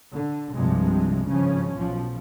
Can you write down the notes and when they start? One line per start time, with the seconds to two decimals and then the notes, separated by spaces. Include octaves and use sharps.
0.12 D3
0.54 C2 G2 C3 F3 G#3
1.29 G#1 C#3 F3 C#4
1.74 B1 B2 F3